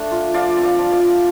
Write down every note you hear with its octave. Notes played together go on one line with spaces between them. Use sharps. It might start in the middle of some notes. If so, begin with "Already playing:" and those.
Already playing: A3 D4
F4
F3 D5 F5
C4
D5 F5
F3
D5 F5
F4